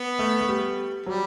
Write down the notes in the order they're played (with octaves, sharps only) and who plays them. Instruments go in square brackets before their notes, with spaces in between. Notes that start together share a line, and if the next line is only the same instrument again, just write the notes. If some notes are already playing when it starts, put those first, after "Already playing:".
Already playing: [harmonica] B3
[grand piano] A3
A3
G3
[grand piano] F#3 [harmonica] G3